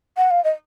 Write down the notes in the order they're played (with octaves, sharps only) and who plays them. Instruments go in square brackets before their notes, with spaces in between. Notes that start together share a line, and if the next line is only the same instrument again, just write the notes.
[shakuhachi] F#5
F5
D#5